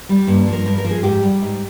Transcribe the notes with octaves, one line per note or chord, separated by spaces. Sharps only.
G3
G2 A#3
D4
F3
A#4
G2 A#4
A#4
F3
G#4
G#2 G4
G3
G#2